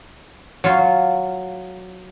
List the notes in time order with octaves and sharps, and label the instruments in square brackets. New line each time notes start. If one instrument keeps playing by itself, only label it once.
[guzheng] F#3 F4